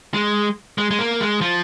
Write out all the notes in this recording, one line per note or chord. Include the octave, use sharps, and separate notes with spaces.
G#3
G#3
G#3
A#3
G#3
F3